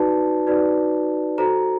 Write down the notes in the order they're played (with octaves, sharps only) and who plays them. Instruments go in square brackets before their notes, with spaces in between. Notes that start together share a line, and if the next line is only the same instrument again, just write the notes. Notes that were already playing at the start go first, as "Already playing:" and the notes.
Already playing: [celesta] D#4 F#4 B4 D5 A5
D#4 F#4 B4 D5
F#4 A4 C5 A#5